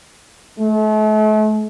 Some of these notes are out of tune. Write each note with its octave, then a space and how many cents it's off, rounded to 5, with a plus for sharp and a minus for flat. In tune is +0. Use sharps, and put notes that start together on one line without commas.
A3 -40